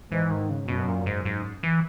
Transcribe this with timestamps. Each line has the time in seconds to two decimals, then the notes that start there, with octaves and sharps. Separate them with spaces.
0.11 G#2 E3
0.31 D#3
0.49 C#3
0.68 F#2 B2
0.88 A#2
1.06 G#2
1.25 G#2
1.63 E3